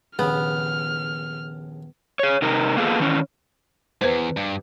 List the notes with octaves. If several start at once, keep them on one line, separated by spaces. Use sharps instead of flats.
A#1 D#2 C#3 B3 F6
G#4 C#5
C3 D#4 A#4
A#3 B3 F4 G#4 A4
D#3 E3 C#4
E2 G#2 B4 C5
G2